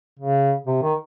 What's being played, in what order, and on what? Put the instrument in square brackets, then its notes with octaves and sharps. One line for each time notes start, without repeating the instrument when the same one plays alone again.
[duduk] C#3
C3
D#3